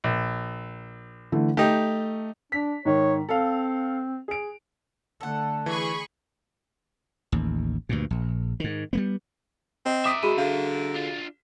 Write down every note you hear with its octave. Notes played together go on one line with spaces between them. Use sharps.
A#1
D3 E3 A3
A3 D#4 G4
D4 B6
G#2 D#3 C#5
C4 A4 F5
G#4 D7
D3 A3 A4 F#5
E3 G#4 B5 C#6
A1 D#2
D2 G2 A#2
A#1
G#2 D#3
G3 A#3 B3
C4 D#5
A#4 E5 D6 D#6 B6
G#3 F#4 G#4 B5 D#7
D3 F5
D4 F4